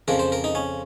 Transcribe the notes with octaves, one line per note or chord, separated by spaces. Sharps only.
F2 C#3 F3 A#4
C5
A#4
D#4
C#4